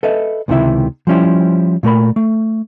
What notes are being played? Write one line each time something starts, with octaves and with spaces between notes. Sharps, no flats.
A4 B4 D#5 E5
C#2 C3 D#3 E4 E5
F3 G3 C#4 E4 C5
A#2 A3 A#4 B5
A3